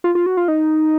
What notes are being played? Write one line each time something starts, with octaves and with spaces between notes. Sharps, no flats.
F4
F4
F#4
F4
D#4